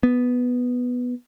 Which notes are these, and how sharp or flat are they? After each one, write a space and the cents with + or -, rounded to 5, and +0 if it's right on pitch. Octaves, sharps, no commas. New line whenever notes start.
B3 +0